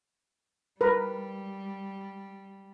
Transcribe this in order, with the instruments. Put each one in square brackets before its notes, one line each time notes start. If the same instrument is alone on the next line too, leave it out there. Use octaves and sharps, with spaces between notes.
[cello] G3 [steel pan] A#4 B4